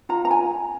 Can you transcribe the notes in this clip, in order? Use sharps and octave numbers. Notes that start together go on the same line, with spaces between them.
F4 A#5
A#5
G#5